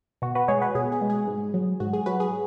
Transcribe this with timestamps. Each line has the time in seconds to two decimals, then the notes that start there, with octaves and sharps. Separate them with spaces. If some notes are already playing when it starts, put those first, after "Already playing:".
0.22 B2 F#4
0.35 F#4 B4
0.48 G#3 G#4 C#5
0.62 F#4 B4
0.75 B2 G#4
0.92 G#4
1.01 G#3
1.10 G#4
1.28 G#2
1.54 F#3
1.80 G#2 F#4
1.93 G#4
2.06 F#3 F#4 B4
2.20 G#4